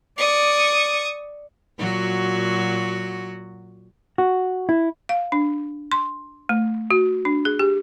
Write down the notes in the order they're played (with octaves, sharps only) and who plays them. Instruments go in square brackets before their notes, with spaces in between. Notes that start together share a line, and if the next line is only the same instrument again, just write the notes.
[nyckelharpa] D5 [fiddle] C#6 D#6
[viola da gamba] A#2 F#3 F#4
[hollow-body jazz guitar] F#4
E4
[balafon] F5
D4
C6
A3
F#4
D4
G#4
G4